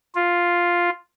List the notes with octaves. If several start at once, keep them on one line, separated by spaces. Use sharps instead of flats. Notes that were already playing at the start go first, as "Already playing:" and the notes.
F4